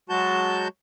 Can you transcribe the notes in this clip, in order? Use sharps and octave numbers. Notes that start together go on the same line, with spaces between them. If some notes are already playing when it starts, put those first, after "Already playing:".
F#3 G#3 F#4 A5 G6